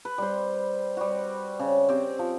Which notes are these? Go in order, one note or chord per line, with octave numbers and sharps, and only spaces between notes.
B4
G3 C5
G3 F#4
C#3
C4 G4
F3